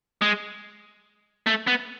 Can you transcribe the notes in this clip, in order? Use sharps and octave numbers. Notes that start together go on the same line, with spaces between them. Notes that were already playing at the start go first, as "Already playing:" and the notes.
G#3
A3
B3